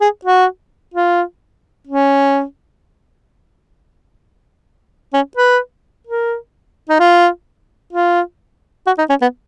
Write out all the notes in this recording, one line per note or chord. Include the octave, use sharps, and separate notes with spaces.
G#4
F#4
F4
C#4
C#4
B4
A#4
D#4
F4
F4
F#4
D#4
C#4
B3